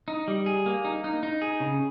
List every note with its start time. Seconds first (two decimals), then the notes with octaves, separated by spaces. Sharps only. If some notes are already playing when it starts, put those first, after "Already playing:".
0.08 D#4
0.28 G3
0.46 G#4
0.66 A#3
0.85 D#4
1.04 D#4
1.23 D#4
1.42 G#4
1.60 C#3